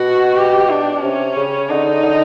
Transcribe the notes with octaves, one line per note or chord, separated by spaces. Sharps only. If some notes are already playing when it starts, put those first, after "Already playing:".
Already playing: B2 F#4
G4
D4
C3 C#4
C#3
D3 D#4
D3